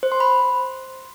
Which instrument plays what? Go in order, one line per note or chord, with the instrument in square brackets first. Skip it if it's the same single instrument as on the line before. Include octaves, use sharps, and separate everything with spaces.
[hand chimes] C5
C6
B5